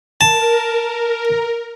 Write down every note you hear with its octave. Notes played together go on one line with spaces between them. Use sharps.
A#4 A5